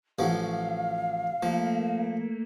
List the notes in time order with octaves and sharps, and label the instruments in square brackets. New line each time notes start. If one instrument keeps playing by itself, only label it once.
[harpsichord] A1 F3 F#3 [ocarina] F5
[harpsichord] F3 [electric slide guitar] A3 A#3